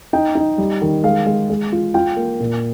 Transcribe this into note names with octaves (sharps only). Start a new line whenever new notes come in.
D#4 G5
D#4
G3
D#3
G#3 F5
G#3
G#3
F4
F4 G5
A#3
A#2